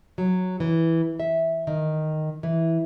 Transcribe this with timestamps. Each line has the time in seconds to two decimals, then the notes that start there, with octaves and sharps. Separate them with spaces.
0.18 F#3
0.60 E3
1.20 E5
1.67 D#3
2.43 E3